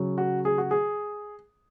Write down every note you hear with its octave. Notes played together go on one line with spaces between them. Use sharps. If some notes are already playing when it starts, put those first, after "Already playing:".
Already playing: C#3 F#3
F#4
G#4
F#4
G#4